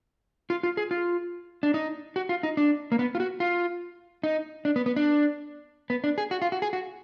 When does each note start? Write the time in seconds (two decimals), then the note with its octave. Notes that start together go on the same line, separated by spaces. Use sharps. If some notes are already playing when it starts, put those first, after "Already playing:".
0.50 F4
0.63 F4
0.77 G#4
0.91 F4
1.63 D4
1.74 D#4
2.16 F#4
2.29 F4
2.43 D#4
2.57 D4
2.92 A#3
2.99 B3
3.15 F4
3.20 F#4
3.40 F4
4.23 D#4
4.65 D4
4.76 B3
4.86 B3
4.96 D4
5.90 B3
6.04 D4
6.18 G#4
6.31 F#4
6.42 F4
6.52 F#4
6.62 G#4
6.73 F#4